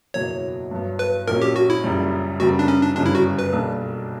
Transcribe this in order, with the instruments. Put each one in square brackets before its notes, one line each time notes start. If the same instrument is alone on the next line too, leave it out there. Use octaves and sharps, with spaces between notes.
[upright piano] F#1 E2 B2 F#3 A#3 [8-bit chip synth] C#5
[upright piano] G2 F#3 B3
[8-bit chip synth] B4
[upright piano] A#1 A#2 F#3 A#3 C#4 [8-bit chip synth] A#4
[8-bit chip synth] G4
F#4
E4
[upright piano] F#1 F#2 C#3 G3
[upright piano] F#2 C#3 G3 B3 [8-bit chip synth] F#4
[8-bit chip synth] D4
C#4
D4
[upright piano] G1 F#2 C#3 G3 B3 [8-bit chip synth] D4
[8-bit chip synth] E4
F#4
B4
[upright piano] B1 B2 G3 A#3 D4